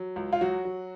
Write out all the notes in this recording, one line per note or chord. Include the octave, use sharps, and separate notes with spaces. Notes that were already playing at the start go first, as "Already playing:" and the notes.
Already playing: F#3
C#2
F4
F#3 F#4
F#3